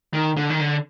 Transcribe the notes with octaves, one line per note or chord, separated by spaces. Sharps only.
D#3
D3
D#3
D3